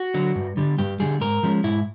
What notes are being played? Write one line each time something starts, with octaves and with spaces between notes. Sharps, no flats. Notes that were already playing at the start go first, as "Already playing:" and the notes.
Already playing: F#4
D3 F#3
G2
D3 G3
G2 G4
D3 G3 G#4
G#2 A#4
F3 G#3 C#4
G#2 E4